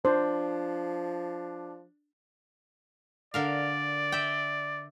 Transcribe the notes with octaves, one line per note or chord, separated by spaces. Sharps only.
F3 D4 C5
D3 A#4 D5 F5
E5 G5